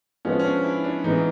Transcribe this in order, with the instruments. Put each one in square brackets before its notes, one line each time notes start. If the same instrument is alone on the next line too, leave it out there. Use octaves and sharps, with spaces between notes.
[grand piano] F3 G#3 B3 [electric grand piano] C#4
[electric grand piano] C#4
D4
E4
D4
[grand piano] E3 G#3 B3 [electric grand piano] D#4